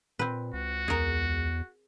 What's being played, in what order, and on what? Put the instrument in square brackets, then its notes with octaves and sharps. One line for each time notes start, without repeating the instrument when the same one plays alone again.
[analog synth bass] A#2 [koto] C4 B4
[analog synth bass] C#2 [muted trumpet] F#4
[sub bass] E2 [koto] G#4 A#4